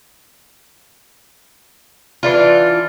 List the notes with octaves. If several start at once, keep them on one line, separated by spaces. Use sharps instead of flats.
E3 D4 F4